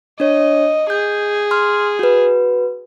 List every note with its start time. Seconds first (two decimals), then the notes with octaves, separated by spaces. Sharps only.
0.20 D4 C#5 D#5
0.90 G#4 G6
1.51 C6 F6
1.99 F#4 B4